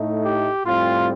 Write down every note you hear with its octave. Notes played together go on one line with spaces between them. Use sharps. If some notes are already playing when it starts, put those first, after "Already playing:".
Already playing: A2 A3 D#4
G4
A2 G3 C4 F4